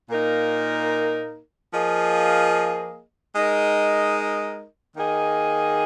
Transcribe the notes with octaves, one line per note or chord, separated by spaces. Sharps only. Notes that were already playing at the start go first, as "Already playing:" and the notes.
A#2 A#3 D#4 A#4
F3 A#3 G#4 D#5
G#3 D#4 A#4 D#5
D#3 A#3 G#4 D#5